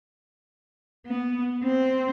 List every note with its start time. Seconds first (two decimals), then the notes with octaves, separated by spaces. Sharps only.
1.06 B3
1.64 C4